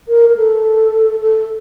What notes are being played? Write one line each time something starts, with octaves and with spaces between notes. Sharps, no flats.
A#4
A#4
A4
A4